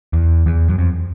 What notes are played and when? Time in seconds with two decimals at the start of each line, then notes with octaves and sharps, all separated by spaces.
0.13 E2
0.46 E2
0.70 F#2
0.78 F2